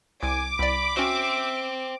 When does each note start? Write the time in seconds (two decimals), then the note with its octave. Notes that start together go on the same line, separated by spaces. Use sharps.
0.23 C2 G#5 D6
0.59 C2 D5 B5
0.97 C#4 F#4 C5 E5 G5